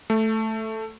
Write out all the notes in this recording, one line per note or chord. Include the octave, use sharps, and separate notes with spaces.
A3